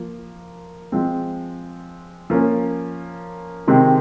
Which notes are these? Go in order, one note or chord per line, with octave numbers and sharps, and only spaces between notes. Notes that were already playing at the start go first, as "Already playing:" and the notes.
Already playing: F3 A#3
F3 G#3 C4
F3 A#3 C#4
C3 D#3 G#3 C4